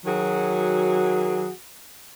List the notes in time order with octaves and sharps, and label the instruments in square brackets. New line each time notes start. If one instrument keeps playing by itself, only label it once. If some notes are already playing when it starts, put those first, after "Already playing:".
[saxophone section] D#3 F#3 F#4 G#4